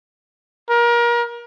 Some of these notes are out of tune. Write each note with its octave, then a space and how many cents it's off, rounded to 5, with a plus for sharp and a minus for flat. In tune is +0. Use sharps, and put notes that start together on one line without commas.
A#4 +30